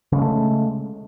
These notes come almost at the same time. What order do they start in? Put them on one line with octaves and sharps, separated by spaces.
C#3 G#3 C#4 A3